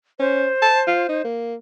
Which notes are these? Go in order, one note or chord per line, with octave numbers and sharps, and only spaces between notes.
C#4 C5
A5
F4
D#4
A#3